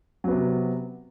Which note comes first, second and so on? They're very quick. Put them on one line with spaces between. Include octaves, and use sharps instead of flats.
F#3 B3 C3